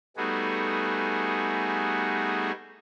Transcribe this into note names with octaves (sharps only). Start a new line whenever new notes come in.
G3 A3 B3 D#4 F#4 G#4